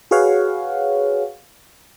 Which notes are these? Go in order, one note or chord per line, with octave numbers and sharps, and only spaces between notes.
F#4 G#4 B4 C#5 F5 F#5